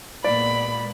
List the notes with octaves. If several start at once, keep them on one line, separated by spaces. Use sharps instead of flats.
A#2 G#3 B3 D5 B5